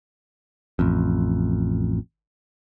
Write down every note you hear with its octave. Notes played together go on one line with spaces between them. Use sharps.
A1 F2